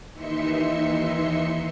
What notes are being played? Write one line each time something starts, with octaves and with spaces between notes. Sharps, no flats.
D#2 E3 D#4 E5 C6 C#7